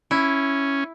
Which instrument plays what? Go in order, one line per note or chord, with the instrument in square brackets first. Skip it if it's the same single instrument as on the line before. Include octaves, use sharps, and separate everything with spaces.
[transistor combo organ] C#4 [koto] E4